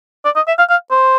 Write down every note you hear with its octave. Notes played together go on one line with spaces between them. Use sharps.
D5
D#5
E5
F5
F5
C5